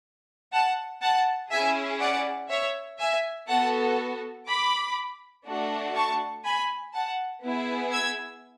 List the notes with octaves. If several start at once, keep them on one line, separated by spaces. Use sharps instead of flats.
F#5 A5
F#5 A5
C#4 E4 G#4 E5 G#5
D5 F#5
C#5 E5
E5 G#5
B3 F#4 A4 F#5 A5
B5 D6
A3 D4 F#4
A5 C#6
G#5 B5
F#5 A5
B3 E4 G#4
E6 G#6